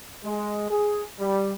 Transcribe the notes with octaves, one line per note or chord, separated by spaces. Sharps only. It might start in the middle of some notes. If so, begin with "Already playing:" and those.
G#3
G#4
G3